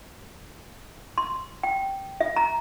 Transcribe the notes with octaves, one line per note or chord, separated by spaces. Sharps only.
C6
G5
E5
A#5